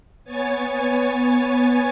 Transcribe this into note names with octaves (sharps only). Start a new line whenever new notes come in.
B3 C#5 G#5 A6